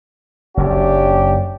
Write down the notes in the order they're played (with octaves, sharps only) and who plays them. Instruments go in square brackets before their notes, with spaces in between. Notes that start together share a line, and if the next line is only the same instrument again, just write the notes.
[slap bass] F#1 F#2 [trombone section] C#4 D4 G4